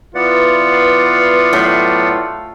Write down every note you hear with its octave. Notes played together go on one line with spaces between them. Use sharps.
E3 B3 F4 D5 F#5
A2 F#3